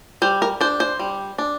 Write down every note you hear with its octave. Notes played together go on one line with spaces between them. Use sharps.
G3 C5
A#4
D4 C5
C5
G3
D4